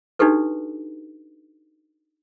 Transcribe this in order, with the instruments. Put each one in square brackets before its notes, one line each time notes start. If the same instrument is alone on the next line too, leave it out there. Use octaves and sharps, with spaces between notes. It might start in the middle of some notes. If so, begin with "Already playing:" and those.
[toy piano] D4 D#4 F#4 G4 A4 B4